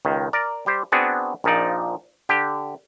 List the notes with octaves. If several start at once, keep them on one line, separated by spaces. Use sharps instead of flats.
C#2 D#3
A#4 D5
G3 G4 C5
B3 C4 D4 F#4 G#4
A#1 A#2 F3 D#4 D5
D3 G4